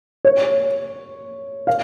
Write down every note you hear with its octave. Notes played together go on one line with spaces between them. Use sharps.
C#5
F5